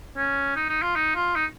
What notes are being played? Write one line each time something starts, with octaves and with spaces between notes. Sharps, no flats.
C#4
D#4
D#4
F4
D#4
F4
D#4